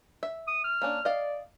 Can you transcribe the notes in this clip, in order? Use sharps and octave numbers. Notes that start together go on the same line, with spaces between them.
E5
D#6
F6
A#3 C#4 D4
D5 D#5 F5